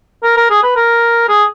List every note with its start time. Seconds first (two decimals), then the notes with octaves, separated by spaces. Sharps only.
0.23 A#4
0.37 A#4
0.50 G#4
0.63 B4
0.76 A#4
1.28 G#4